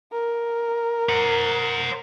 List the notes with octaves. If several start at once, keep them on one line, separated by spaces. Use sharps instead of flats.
A#4
C5 F#5